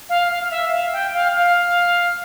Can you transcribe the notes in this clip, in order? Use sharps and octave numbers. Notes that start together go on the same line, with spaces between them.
F5
F5
F5
E5
F5
G5
F5
F5